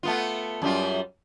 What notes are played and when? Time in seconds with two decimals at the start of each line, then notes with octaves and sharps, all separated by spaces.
0.03 A3 B3 F4
0.62 F#2 G3 F4